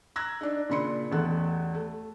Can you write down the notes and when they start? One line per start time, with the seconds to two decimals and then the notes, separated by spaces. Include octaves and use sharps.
0.16 A#5 E6 F#6 G#6 A#6
0.41 D4 D#4
0.69 A#2 C#3 D4 B5 C6 C#7
1.12 A1 E2 A4 F#6
1.74 A3